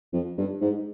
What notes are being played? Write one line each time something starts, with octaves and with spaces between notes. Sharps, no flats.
F2
G2
G#2